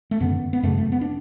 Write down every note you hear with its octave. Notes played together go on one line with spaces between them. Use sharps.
A3
F#2 D3 B3
B3
F#2 C#3 A3
A3
B3
D4